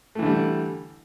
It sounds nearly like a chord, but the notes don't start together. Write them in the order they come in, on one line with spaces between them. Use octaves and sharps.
A3 E3 D3 G3